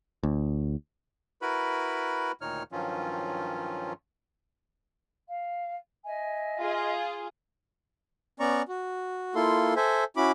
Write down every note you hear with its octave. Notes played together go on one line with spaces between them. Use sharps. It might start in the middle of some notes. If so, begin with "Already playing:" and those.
D2
E4 F#4 A#4 B4 B5
D2 A#2 D#3 D#4 C#5 F6
G2 D#3 F3 F#3 C#4 F4
F5
D#5 E5 G#5
F4 G#4
B3 C#4 D5 A#5 C#6
F#4
A#3 E4 F4 A4 C6
A4 C5 E5 G#5
C#4 E4 F#4 B5 D6